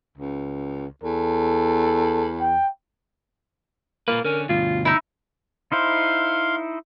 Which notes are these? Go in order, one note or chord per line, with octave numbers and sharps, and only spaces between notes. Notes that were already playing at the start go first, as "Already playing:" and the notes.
C#2
E2 A4
G5
A#2 A#3 F4 B4
D3 C#4 A#4
D2 G2 B2 F4
D#4 E4
D#4 E4 C5 F5 C6